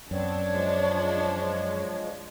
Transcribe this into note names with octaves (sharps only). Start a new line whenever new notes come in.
F#2 B3 C4 D4 C#5
F3 G#3